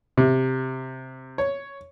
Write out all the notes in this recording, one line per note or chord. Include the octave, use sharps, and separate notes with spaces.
C3
C#5